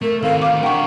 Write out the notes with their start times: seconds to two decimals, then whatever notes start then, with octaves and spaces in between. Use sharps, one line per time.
0.02 A3 A#4
0.23 D#3 C4 A4 F5
0.42 F5 D6 F6
0.63 D4 A#4 F#5 G5 C#6